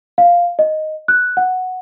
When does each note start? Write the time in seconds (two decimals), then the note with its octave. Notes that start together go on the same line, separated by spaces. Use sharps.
0.18 F5
0.59 D#5
1.08 F#6
1.37 F#5